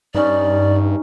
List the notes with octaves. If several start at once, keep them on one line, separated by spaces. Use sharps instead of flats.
G2 C#4 D#4 D5